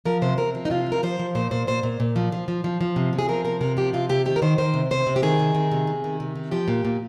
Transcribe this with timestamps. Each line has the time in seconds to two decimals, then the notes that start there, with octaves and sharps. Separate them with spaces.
0.05 F3 A#4
0.22 C3 C5
0.38 C3 A#4
0.55 F3
0.65 D#4
0.70 C3 F4
0.87 F3
0.92 A#4
1.03 F3 C5
1.19 F3
1.35 A#2 C5
1.51 A#2 C5
1.67 A#2 C5
1.83 A#2
2.00 A#2
2.16 F3
2.32 F3
2.48 F3
2.64 F3
2.81 F3
2.96 C3
3.13 C3
3.19 G#4
3.29 F3 A#4
3.45 C3 A#4
3.61 C3 A#4
3.77 F3 G4
3.93 C3 F4
4.09 C3 G4
4.26 D#3 G4
4.36 A#4
4.42 D#3 C5
4.58 D#3 C5
4.74 C3
4.91 C3 C5
5.07 C3
5.16 G4
5.23 D#3 G#4
5.39 C3
5.55 D#3
5.71 C3
5.87 C3
6.04 D#3
6.20 C3
6.36 D#3
6.51 F3 G4
6.68 A#2
6.85 A#2